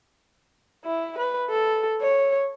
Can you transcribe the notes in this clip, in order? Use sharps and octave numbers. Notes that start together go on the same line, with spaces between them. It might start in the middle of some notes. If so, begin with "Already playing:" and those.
E4
B4
A4
C#5